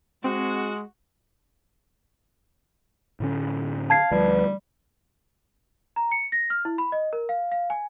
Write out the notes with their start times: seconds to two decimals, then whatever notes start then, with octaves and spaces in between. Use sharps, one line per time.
0.24 G#3 C4 F#4
3.20 A2 D3 C#4
3.90 F5 A5 G#6 C7
4.11 D2 F3 G3 B4
5.96 A#5
6.12 C#7
6.32 A#6
6.50 F6
6.65 E4
6.78 B5
6.92 D#5
7.13 A#4
7.29 F5
7.52 F5
7.70 G#5